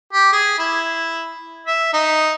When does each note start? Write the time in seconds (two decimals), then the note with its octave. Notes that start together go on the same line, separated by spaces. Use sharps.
0.13 G4
0.32 G#4
0.59 E4
1.67 E5
1.93 D#4